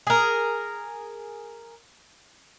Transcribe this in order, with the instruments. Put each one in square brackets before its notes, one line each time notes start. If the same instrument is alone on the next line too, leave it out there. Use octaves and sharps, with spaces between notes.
[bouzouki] G#4 A#4